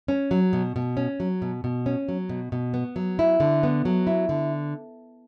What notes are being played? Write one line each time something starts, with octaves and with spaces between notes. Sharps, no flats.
C#4
F#3
B2
B2
C#4
F#3
B2
B2
C#4
F#3
B2
B2
B3
F#3
E4
D3
B3
F#3
E4
D3